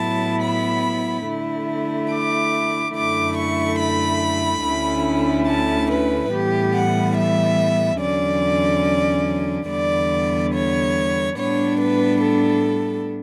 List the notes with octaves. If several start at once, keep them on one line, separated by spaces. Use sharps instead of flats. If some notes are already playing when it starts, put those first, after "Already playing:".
Already playing: A2 F#3 B3 E4 A5
B5
D3 A3 E4
D6
F#2 D3 A3 E4 D6
C#6
B5
D2 D3 A3 C#4 E4
A5
B4
A2 E3 G3 B3 G4
F#5
E5
E2 D3 F#3 C#4 D5
E2 D3 G3 B3 D5
C#5
A2 G3 B3 D4 C#5
B4
A4